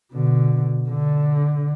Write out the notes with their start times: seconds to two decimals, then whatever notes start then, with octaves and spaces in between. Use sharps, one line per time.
0.12 B2 D3
0.90 D3